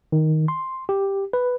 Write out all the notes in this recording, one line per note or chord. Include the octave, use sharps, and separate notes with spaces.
D#3
C6
G4
B4